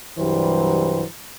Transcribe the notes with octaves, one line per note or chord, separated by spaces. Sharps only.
C2 G2 E3 F#3 G3 C5